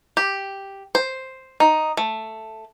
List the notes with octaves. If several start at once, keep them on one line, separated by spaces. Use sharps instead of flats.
G4
C5
D#4
A3